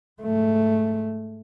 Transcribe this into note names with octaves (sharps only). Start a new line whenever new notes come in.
G#2 A3